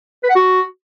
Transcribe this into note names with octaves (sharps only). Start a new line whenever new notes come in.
B4
F#5
F#4